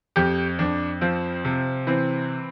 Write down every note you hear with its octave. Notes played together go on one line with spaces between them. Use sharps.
F2 G4
F2 D4
F3 C4
C3
E3 C4